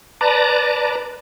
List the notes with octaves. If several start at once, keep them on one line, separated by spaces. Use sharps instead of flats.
B4 D5 A5 A#5